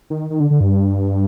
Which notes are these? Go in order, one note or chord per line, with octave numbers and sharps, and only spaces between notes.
D#3
D#3
D3
D3
G2